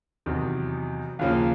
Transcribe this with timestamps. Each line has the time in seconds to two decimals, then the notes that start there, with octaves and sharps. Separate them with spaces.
0.26 E2 C3 D#3 F#3
1.19 D#2 C#3 F3 A#3 C#4